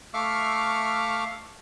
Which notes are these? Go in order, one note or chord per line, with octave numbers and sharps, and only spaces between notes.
A3 E5 F5 C#6 D6 F6